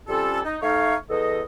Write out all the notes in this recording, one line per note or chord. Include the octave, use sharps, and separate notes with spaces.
C3 G3 C#4 F4 A4
D#4
A3 D#4 C#5 F5
E2 A4 D#5